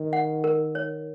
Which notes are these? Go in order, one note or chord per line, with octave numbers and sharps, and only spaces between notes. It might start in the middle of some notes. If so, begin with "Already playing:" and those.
Already playing: D#3
F#5
A#4
C#5